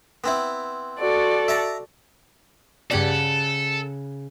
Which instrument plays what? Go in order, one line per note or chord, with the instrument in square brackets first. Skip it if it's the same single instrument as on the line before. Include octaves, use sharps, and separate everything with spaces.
[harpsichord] B3 C4 E4
[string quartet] F#4 A4 D5
[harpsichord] E5 A5 A#5
[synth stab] G2 G4 D5 [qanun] C#3 F#5 B5 [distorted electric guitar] A4